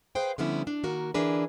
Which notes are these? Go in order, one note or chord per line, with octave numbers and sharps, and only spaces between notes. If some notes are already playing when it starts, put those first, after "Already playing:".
G#4 B4 C5 F5 G5
D3 F3 G3 B3 C#4 E4
D4
D#3 A#3 F#4 A#4
D3 E3 D4 G#4 A#4 B4